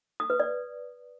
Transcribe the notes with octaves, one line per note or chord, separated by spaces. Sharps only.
D#6
B4
D5